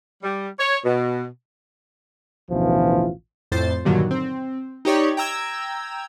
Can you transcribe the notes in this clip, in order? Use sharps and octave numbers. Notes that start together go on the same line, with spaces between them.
G3
C#5
B2
A1 D2 B2 E3 F3 F4
F2 A2 C5 A6 C7
G2 A#2 D3 D#3 F#3
C4
D#4 G4 C#5 D5
G5 A#5 E6 G#6